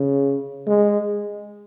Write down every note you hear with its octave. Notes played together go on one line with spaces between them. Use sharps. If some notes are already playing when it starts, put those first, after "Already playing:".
Already playing: C#3
G#3